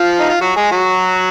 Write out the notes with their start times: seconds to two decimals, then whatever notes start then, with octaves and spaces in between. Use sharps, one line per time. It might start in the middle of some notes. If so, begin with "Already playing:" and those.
Already playing: F3 F4
0.19 D#4
0.29 F4
0.41 F#3 F#4
0.57 G#3 G#4
0.72 F#3 F#4